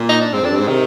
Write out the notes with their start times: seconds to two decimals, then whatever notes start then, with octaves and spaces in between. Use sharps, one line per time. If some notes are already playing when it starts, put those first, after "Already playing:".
Already playing: A#2
0.09 D#4
0.21 D4
0.33 G#2 C4
0.41 F2
0.45 D4
0.50 G2
0.56 G#2 C4
0.67 C3 D#3